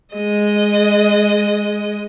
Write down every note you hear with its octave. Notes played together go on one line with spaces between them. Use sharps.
G#3 D#5